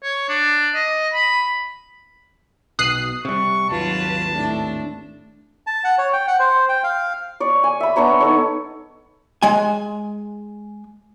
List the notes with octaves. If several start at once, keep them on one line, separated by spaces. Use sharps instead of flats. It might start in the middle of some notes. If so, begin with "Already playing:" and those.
C#5
D4
D#5
B5
B1 B2 D#6 F#6 C7
C3 G3 C#6
G#1 D#2 F#3 F4 B4 A5
A2 D4
A5
F#5
C#5
G5
F#5
C5
G5
F5
C#5 D5
G#5
E5 B5
B3 D4 C#5 A#5
D#4 A4 C#5
G#3 G#5